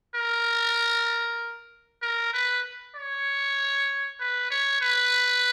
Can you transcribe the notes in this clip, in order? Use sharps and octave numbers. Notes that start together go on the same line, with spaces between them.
A#4
A#4
B4
C#5
B4
C#5
B4